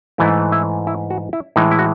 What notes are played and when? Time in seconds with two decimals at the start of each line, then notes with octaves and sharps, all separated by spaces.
0.18 G#2 E3 A3 E4
0.52 E4
0.87 E4
1.10 F#4
1.33 E4
1.56 A2 E3 G#3 D#4
1.71 E4
1.79 F#4